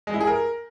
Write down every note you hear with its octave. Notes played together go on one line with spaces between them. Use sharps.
G#3
E4
G#4
A#4